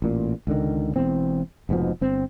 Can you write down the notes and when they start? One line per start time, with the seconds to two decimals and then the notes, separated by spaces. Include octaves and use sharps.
0.02 A1 A#2
0.47 C#2 D3 D#3
0.96 E1 E2 C4
1.69 F1 G#2 B2 F3
2.01 G1 C4